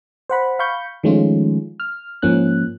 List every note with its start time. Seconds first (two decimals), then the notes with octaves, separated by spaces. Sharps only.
0.30 C5 F#5 B5
0.59 F5 B5 C#6 G6
1.03 D#3 F3 G#3 A3 C#4 F4
1.80 F6
2.22 G#2 F3 A#3 C#4 F#6